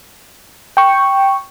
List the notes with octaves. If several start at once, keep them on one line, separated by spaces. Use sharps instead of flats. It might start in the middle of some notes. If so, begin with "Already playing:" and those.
G5 C#6